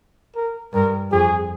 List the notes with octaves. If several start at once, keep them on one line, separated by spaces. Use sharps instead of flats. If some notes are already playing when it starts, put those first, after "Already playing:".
A#4
G2 A#4
F2 G#4